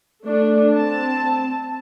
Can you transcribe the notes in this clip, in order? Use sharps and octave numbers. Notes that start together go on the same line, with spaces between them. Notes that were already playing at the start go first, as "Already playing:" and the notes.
A3 D4
C4 A5